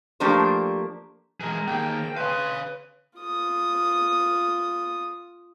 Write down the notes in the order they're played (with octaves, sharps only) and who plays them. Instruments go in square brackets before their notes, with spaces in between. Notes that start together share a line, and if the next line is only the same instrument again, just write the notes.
[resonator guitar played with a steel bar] F3 A3 A#3 D4 G4 C5
[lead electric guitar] E3 G#3 [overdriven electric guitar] G#4 A#4
[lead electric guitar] D#3 A#3 [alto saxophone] G5
[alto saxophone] B4 [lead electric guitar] C#5 F5 [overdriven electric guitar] G#5 C6
[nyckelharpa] F4 D#6